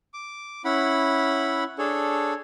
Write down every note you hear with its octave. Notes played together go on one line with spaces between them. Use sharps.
D6
C#4 E4 F#5 B5
D4 G#4 A4 C#5